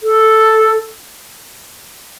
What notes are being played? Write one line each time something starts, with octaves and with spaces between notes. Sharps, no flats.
A4